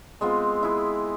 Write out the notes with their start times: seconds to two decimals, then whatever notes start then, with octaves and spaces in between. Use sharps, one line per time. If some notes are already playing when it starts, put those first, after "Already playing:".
0.21 G#3 B3 C4 F4
0.63 E4 G#4